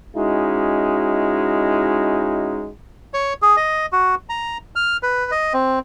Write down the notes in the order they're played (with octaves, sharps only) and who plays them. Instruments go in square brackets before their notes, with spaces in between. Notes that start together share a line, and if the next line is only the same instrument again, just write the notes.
[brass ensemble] G#3 C#4 D#4 E4 F#4
[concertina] C#5
G#4
D#5
F#4
A#5
F6
B4
D#5
C4